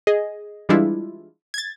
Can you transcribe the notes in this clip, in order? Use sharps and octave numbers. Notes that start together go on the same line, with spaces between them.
G#4 D#5
E3 G3 G#3 D4 E4 F4
G#6 A6